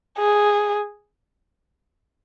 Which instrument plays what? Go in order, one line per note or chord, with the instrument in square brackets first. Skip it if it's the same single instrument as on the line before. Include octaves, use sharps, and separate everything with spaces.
[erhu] G#4